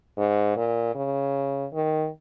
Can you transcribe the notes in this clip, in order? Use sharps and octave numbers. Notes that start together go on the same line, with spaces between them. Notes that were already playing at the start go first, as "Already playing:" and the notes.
G#2
A#2
C#3
D#3